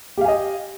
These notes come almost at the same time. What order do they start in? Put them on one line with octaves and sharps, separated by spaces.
G4 F5 G#5 D#5